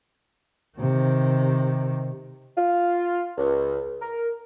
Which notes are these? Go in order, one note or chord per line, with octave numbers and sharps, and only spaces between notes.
C3 D#3
F4
C#2
A#4